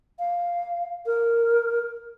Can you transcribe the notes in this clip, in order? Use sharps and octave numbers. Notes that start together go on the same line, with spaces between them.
F5
A#4